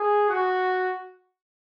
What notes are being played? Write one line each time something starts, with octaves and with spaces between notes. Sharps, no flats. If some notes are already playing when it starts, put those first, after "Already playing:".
Already playing: G#4
F#4